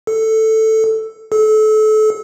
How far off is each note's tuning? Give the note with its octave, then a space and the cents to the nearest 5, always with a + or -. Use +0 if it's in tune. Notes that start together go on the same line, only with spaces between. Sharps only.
A4 +5
A4 -30